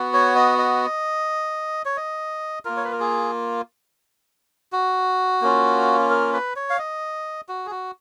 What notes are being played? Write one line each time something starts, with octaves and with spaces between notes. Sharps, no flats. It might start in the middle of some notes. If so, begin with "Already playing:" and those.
Already playing: B3 F#4
C#5
D#5
D#5
C#5
D#5
A#3 F4 A#4
C#5
B4
A#4
G#4
F#4
A#3 C#4 F4
A#4
B4
C#5
F5
D#5
F#4
G#4
F#4